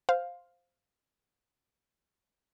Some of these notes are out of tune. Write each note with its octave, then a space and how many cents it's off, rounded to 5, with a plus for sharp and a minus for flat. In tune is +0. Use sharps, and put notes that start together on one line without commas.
C5 +0 F5 +10